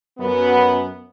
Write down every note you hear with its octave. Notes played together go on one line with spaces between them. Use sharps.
F#2 B3